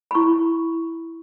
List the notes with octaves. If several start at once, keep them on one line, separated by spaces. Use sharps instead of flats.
B5
E4 C#6